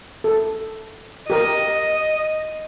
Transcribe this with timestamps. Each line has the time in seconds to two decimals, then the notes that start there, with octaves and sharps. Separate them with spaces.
0.24 A4
1.30 G4 A#4 D#5